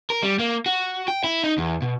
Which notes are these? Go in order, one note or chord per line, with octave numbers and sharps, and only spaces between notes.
A#4
G3
A#3
F#4
G5
E4
D#4
E2
B2